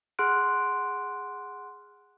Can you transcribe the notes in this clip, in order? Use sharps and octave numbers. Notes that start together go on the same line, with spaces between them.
G#4 F#5 C6 F6 F#6 D7